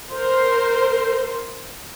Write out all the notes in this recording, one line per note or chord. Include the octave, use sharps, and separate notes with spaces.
A#4 C5